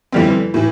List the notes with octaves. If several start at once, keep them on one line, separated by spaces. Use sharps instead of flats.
F2 D3 E3 G3 C4
A2 E3